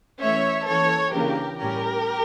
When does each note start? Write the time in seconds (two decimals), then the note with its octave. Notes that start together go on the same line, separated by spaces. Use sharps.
0.21 E3 A3 C#4 C#5 E5
0.67 E3 A#3 C#4 A4 C#5
1.13 C#3 E3 A#3 D4 G4 A#4
1.59 A2 G3 C#4 G4 A#4